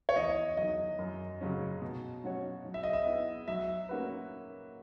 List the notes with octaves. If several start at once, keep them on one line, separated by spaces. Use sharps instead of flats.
C#5
E2 D#5
D#3 F#3 D#5
F#2
C#3 F#3 C#4
B2
F#3 C#4 F#4 C#5
F#3
E5
D#5
E5
B3 E4
F#3 E5
A#3 C#4 F#4 B4